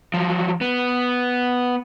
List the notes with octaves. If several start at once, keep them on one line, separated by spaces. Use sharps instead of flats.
F3 F#3
B3